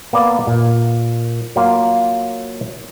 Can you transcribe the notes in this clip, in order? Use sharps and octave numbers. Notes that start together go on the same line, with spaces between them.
A#3 B3 D5
A#2
F#3 A#3 F4